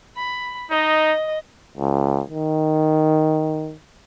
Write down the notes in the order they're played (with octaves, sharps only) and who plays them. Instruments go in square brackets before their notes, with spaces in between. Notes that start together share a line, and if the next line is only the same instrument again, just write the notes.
[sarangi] B5
[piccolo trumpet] D#4 [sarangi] D#5
[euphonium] C#2
D#3